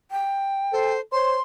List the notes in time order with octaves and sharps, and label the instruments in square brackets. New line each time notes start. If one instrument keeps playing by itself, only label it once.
[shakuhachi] G5
[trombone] A4 [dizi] C5
[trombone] C5 [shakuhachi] C#5 [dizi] C6